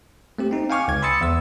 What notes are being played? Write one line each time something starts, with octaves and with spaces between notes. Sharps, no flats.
A3 C4 G4
C4 D#4
F5 G5 G#5 C#6 D6 F6
C#2 G#6
B5 C6 D#6 E6 A6 C#7
E2 E6